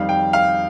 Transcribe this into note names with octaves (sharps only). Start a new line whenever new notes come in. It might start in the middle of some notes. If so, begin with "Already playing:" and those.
Already playing: F2 D#3 G3 F5
G5
F5